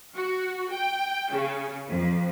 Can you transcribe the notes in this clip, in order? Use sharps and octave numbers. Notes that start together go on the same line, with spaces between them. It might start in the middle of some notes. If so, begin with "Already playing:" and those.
F#4
G5
C#3
F2